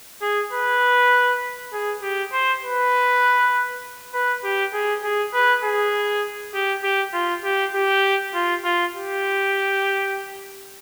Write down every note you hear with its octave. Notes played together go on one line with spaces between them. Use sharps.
G#4
B4
G#4
G4
C5
B4
B4
G4
G#4
G#4
B4
G#4
G4
G4
F4
G4
G4
F4
F4
G4